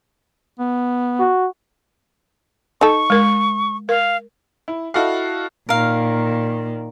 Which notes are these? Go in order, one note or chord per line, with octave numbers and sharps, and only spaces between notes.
B3
F#4
D#4 A4 C#6
G#3 A#4
A#4 F5
E4
E4 F#4 A4 D#5 F5
A#2 D#3 A#4 F5